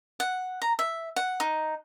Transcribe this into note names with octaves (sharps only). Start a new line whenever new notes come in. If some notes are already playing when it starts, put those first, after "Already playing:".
F#5
A#5
E5
F#5
D#4